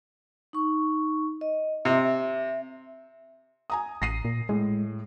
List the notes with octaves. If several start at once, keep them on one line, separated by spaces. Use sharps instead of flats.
D#4 C#6
D#5
C3 E5
G#5 A#5 D#6
A1 A#6 C7 D#7
A#2
A2 G#3